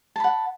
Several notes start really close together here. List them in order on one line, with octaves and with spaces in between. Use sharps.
A5 B5 F#5